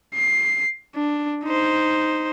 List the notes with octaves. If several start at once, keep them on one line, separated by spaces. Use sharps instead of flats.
C7
D4
D#4 C5